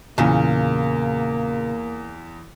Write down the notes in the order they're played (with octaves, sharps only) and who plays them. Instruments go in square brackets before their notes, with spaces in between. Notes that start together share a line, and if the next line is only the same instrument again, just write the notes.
[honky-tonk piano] E2 [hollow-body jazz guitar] A#2 C#3 [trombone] A#3